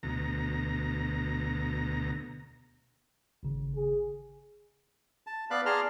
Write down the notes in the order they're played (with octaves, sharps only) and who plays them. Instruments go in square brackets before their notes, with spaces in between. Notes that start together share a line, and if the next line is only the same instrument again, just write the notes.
[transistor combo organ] D2 B2 A#5
[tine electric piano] G#1 C#3
[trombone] G#4
[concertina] A5
B3 D5 F5 B5 F#6
G#4 D5 A5 A#5 C6 F6